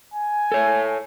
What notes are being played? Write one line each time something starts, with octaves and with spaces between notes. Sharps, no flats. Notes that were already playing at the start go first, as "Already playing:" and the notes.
G#5
A4 C#5